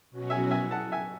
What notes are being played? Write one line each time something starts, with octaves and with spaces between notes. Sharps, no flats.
B2 F#3 C#4 F#4
E5 G#5
E5 G#5
F#5 A5
E5 G#5